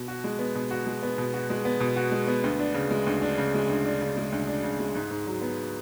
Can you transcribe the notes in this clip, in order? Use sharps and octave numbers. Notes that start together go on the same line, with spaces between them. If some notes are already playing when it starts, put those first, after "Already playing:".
Already playing: B2
F#4
G#3
B3
B2
F#4
G#3
B3
B2
F#4
G#3
B3
B2
F#4
G#3
B3
D2
D4
C#3
G#3
D2
D4
C#3
G#3
D2
D4
C#3
G#3
D2
D4
C#3
G#3
G#2
G#2
F#3
B3